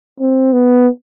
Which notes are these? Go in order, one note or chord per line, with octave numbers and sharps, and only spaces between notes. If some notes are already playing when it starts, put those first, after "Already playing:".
C4
B3